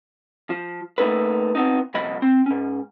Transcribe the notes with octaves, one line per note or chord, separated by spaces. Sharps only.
F3
A3 A#3 D#4 A4 B4
B3 C4 D#4
C2 A#2 F3 D#5 B5
C4
G#2 C#4